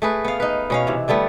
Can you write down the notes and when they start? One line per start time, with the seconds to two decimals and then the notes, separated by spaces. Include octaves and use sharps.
0.02 A3 G#4 B4
0.25 B3 F5
0.40 D#4 B4
0.70 B2 C#4 F5
0.87 C3 E3
1.08 D3 G3 A3 B3